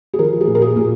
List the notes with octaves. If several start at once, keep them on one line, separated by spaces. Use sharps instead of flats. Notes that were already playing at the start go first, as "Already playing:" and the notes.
G#4
F3 A#4
G#4
A#2
A#4
G#4
A#2